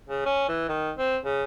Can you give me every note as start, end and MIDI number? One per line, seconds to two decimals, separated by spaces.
0.08 0.23 49
0.26 0.46 61
0.48 0.67 52
0.69 0.91 51
0.97 1.17 60
1.25 1.44 49